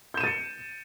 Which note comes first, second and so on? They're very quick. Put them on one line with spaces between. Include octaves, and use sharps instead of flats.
G6 E7 D#7 A6 C#7